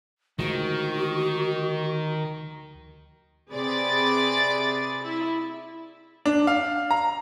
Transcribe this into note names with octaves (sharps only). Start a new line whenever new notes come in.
D2 D#3 F3 G#3 F#4
C3 G#4 B4 D5 A6
E4
D4
F5
A#5